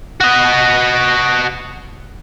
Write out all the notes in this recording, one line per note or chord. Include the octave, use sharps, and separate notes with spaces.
F#4 D#5